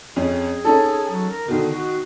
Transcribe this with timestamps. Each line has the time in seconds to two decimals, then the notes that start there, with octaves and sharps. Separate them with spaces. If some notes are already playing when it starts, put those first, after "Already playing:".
0.16 F2 C#4 G#4
0.65 C#4 D#4 A4
1.11 F#3
1.29 A#4
1.48 B2 D3 D#3
1.71 F#4